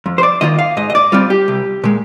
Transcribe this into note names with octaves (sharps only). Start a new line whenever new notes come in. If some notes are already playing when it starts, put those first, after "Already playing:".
F2
C5
D5
D#3 A#3 F4 D#5
F5
G#2 D#5
D#5
D5
G3 C4 F4
G4
C2
A#2 G#3